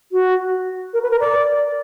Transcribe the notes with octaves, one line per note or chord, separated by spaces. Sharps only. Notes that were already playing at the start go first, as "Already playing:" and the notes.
F#4
A#4
B4
A#4
D5